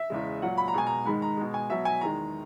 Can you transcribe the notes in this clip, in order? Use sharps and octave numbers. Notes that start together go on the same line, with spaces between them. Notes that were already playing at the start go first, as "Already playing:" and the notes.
Already playing: E5
E2 C#3 G#3
A#2 F#3 F#5
B5
A#5
B2 G#3 G#5
A#5
G#2 D#3 G#3 B5
A#5
B2 G#3
G#5
B2 F#3 E5
G#5
E2 D#3 G#3 A#5